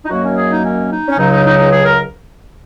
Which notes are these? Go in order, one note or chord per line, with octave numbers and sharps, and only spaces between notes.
D#4
F#2 D#3 F#3 A#3 F#4
C#4
G#4
D#4
C#4
D#4
C#4
C#2 C#3 F#3 D#4
D#4
D#4
D#4
G#4
A#4